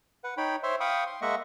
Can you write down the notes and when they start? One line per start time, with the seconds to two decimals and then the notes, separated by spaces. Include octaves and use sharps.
0.24 B4 F#5
0.37 D#4 C#5 G5 B5
0.63 C5 C#5 E5 C6
0.80 F5 G5 B5 C#6 D#6
1.06 C6
1.22 G#3 A#3 D#5 E5 F#5 C#6